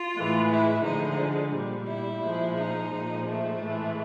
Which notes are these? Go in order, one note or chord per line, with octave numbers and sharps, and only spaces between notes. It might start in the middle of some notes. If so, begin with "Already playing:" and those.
Already playing: F4
A2 E3 G#3
E4
D3 F3 G#3 D#4
A#2 G3
E4
A#2 F3 G#3
D#4
A#2 F3 G#3
A3
A2 E3 G#3